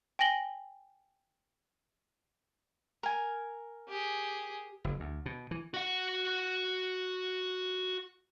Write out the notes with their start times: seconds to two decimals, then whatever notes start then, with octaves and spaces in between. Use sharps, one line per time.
0.19 G5 G#5 A#6 F#7 G7
3.03 A#4 G#5
3.88 G4 G#4
4.84 F#1
5.00 D2
5.26 B2
5.51 E3
5.74 F#4 F#5